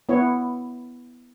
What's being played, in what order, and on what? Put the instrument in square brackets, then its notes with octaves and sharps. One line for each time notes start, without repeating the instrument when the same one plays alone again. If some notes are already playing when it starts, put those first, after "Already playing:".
[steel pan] B3 E4 C#5